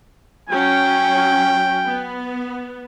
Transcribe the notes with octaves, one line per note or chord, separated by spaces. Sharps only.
F#3 C#4 G5
B3